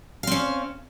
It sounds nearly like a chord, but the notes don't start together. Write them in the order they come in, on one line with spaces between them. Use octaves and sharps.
F5 C4 C#4